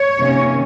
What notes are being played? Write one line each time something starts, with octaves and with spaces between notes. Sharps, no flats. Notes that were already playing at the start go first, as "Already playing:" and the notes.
Already playing: C#5
C3 D#3 A#3 C#4